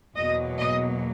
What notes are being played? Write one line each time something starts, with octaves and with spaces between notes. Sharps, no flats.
E2 B2 F#3 A#3 D#5
D#5